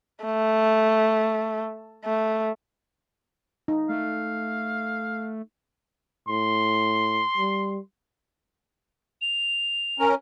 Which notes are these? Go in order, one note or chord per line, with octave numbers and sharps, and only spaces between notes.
A3
A3
D#4
A3 F5
A2 C6
G3
F7
C#4 A#4